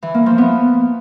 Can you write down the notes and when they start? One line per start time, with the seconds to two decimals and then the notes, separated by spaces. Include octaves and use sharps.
0.03 E3
0.14 A#3
0.26 F3
0.38 B3